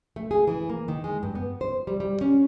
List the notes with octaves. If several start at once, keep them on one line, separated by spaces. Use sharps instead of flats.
A3
G#4
E3
A#3
D#3
G#3
G2
B3
C5
G3
G3
C#4